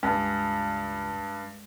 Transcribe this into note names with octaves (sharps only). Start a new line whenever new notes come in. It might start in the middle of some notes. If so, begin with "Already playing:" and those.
C#2 G2 G#3